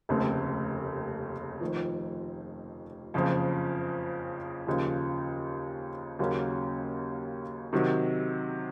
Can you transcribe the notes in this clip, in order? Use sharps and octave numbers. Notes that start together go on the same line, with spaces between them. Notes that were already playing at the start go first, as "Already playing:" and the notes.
F1 D#2 C#3 A3 C4
F1 F2 D#3
F#1 F2 C#3 F3
D#2 C#3 F3
D#2 C#3 F#3 A#3 C#4
C3 D#3 F#3